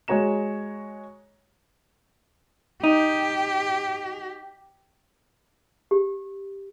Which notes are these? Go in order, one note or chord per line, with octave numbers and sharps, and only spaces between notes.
G#3 F#4 C#5 A#5 E7
D#4 G4
G4